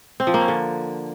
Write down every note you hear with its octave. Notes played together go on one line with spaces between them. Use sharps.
C4
F3
A#3
C#4
D3